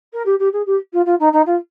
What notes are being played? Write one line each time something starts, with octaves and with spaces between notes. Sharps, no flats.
A#4
G4
G4
G#4
G4
F4
F4
D#4
D#4
F4